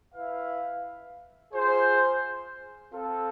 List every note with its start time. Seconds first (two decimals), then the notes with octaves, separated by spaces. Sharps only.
0.14 E4 B4 F5
1.54 F4 G#4 C5
2.94 C4 F4 A4